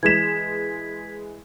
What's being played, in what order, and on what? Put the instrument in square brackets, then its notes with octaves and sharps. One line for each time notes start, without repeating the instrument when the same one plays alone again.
[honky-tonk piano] E3 G#3 E7 [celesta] G#6 B6